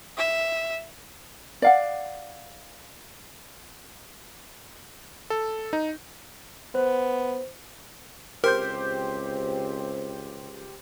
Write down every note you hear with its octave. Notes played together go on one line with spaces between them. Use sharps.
E5
D5 F5 F#5
A4
D#4
B3 C5
C#2 C4 G4 A#4 C5 G6